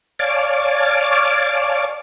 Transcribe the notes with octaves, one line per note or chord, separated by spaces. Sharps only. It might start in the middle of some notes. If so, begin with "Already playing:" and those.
C#5 D5 F5 G#5 A5 D6